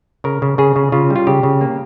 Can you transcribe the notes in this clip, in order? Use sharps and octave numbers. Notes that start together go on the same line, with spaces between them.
C#3 A#4
C#3
C#3 G#4
C#3
C#3 F4
G3
F4
C#3 G4
C#3
A#3